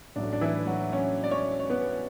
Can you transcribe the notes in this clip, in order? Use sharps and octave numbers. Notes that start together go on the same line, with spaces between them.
A1 A2 F#3 A3 D4
D4
E3 E4
F#3 F#4
C#4 C#5
D5
C#4 C#5
C#5
B3 B4